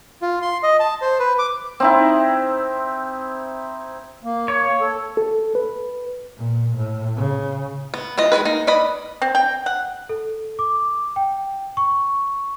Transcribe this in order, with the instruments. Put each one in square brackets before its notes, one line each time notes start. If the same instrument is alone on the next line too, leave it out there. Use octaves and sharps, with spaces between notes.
[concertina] F4
C6
D#5
A5
C5
B4
D6
[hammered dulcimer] C4 D#4 E4
[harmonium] A#3
[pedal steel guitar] C#5
[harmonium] A4
[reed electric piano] A4
B4
[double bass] A#2
A2
C#3
[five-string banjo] B3
E3 F4 D#5
G#3 A#3 G#4 B4
A#3 D#4
B4 D5 D#5 B5
[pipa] C4
G5
F#5
[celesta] A4
D6
G5
C#6